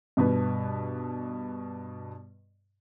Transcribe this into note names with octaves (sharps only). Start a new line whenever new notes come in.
G2 B2 B4